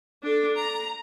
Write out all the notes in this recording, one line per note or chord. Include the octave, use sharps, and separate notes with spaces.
D4 A4
A#5